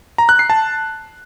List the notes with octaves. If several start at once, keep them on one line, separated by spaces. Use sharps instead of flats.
A#5
F#6
C7
A5